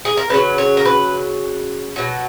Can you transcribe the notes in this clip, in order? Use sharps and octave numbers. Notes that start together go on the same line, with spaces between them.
G#4
A#4
C#3 F#3 B4
C#5
A#4
B4
B2 F#3